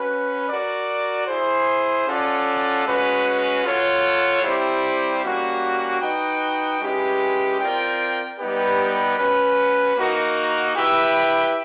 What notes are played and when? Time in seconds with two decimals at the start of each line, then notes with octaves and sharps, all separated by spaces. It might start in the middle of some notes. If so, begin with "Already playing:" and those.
Already playing: C#4 F#4 B4
0.49 F#4 A#4 D5
1.27 E4 G#4 C5
2.07 C#4 F4 A4 D5 F#5
2.85 G#3 C#4 F#4 B4
3.65 F4 A4 C#5 F#5
4.43 G3 C4 E4 G4 C5
5.23 G3 A#3 C#4 F#4
6.02 D#4 F#4 B4 D#5 G5
6.81 G#3 C#4 E4 G4 B4
7.60 C4 F4 A#4 D5 G5
8.39 G3 B3 D#4 G4 B4
9.18 C#4 F#4 B4
9.97 A#3 D#4 F#4 A#4
10.76 E4 G4 B4 E5 G5